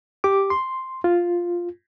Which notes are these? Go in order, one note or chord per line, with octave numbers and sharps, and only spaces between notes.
G4 D6
C6
F4